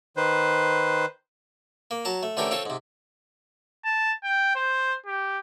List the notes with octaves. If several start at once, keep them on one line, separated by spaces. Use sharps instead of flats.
D#3 B4 C5
A#3
F#3 A5 A#5
A3
D3 E3 A3 C#4 G4 A#4
C4 F4 A4 C#5
G#2 C3
A5
G5
C5
G4